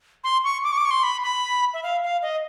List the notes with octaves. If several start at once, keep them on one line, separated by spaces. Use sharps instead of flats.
C6
C#6
D6
C#6
D6
C#6
C6
B5
B5
E5
F5
F5
D#5